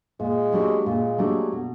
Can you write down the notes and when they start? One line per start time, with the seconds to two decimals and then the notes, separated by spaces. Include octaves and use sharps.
0.20 A#2 G#3
0.52 F#3 A3 D4 G4
0.86 A#2 G#3
1.18 F#3 A3 D4 G4
1.52 B2